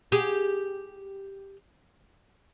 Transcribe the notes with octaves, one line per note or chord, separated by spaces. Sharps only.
G4 G#4